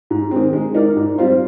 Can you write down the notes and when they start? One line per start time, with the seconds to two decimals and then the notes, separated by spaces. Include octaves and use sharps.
0.11 G#2
0.31 D#3 G#3 C4
0.53 G#3
0.75 D#4 A#4 D5
0.96 G#2
1.18 G3 C4 F4 C5